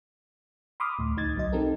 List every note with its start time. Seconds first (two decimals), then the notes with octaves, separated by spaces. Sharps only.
0.80 B5 C6 D6 D#6 F6
0.99 D2 A2
1.17 D2 D#4 G#6 A6
1.36 B1 F#3 D#5
1.52 C4 D#4 G4 A4 A#4